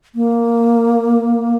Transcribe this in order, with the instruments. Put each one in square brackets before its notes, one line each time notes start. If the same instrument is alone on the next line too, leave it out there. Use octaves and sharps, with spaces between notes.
[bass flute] A#3